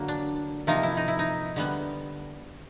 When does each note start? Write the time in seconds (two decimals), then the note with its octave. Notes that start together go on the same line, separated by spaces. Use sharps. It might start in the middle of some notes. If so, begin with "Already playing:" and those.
Already playing: D3 F#3 A#3
0.08 D4
0.67 C3 F3 A#3 D#4
0.83 E4
0.97 D#4
1.08 E4
1.19 D#4
1.56 D3 G3 B3